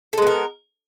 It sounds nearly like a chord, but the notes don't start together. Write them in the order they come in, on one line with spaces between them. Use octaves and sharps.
A4 G#3 B3 A#4